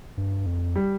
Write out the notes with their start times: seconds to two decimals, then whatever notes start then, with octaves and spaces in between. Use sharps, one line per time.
0.17 G2
0.46 F2
0.76 G3